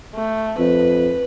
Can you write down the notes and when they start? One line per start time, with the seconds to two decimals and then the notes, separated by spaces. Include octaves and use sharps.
0.15 A3
0.59 F2 B4